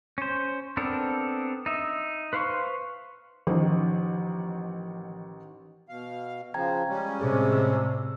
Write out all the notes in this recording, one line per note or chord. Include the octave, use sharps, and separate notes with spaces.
C#4 C5
B3 C4 D4 A4 A#4
D#4 E5
B4 C5 F5 C6 C#6
A1 D#3 F3
B2 F5
C#3 F3 G5 A#5 G#6
G3 G#3 C#4
A2 C3 G#4
E6